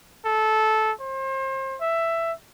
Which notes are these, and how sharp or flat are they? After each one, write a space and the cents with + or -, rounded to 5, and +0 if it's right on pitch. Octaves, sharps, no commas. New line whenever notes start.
A4 -15
C5 +35
E5 +10